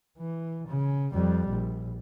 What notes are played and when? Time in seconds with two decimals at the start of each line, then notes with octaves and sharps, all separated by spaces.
0.18 E3
0.68 C#3
1.13 F2 G3
1.49 A#1